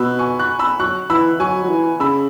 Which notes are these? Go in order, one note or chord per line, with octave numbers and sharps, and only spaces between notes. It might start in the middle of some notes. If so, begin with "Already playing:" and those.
Already playing: B2 B5 E6 F#6
G#5 C#6
C#6 F#6
B5 E6
F#3 C#6 F#6
E3 B5 E6
F#3 G#5 C#6
F#3
E3
C#3 B5 E6